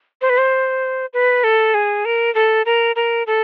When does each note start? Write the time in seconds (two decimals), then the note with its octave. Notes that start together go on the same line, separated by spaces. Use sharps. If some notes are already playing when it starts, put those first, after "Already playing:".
0.22 C5
0.30 B4
0.38 C5
1.13 B4
1.44 A4
1.74 G#4
2.05 A#4
2.35 A4
2.66 A#4
2.96 A#4
3.27 A4